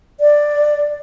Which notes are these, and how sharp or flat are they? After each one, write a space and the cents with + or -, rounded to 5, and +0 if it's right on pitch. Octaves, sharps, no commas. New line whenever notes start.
D5 +10